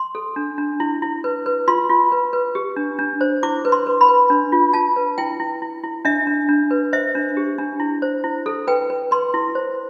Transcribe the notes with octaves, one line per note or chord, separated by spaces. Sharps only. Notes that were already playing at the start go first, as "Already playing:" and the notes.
Already playing: C6
A4
D4
D4
E4
E4
B4
B4
F4 C6
F4
B4
B4
G4
D4
D4
C5
E4 D6
B4
C6
B4
B5
B4
D4
F4
F4 A5
B4
E4 G5
E4
E4
E4
D4 E5
D4
D4
B4
C5 E5
D4
G4
D4
E4
C5
E4
A4
B4 G5
B4
B4 C6
E4
C5